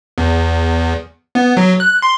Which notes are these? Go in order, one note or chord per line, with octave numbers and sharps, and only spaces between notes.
E2
B3
F#3
F#6
C6